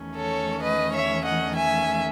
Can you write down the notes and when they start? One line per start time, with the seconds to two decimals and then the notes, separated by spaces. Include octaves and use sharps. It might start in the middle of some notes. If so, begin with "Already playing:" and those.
Already playing: E2 D#3 A3 C#4
0.16 A4 C#5
0.62 B4 D#5
0.93 C#5 E5
1.24 D#5 F#5
1.55 E5 G#5